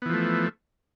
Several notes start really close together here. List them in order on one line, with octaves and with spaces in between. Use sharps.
B3 E3 F3 A3